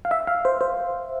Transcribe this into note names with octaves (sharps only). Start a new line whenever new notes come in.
F5
E5
F5
C5
C5